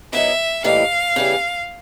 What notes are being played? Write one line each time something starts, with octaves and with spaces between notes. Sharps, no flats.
D#3 F#3 B3 E4 E5
A2 E3 G3 A#3 D#4 F5
C#3 E3 G3